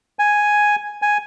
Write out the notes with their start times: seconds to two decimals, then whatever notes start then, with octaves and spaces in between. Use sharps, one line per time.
0.19 G#5
1.02 G#5